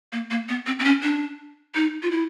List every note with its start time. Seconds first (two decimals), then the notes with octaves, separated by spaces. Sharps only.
0.12 A#3
0.31 A#3
0.49 B3
0.67 C4
0.79 C4
0.84 C#4
1.03 D4
1.75 D#4
2.03 F4
2.11 E4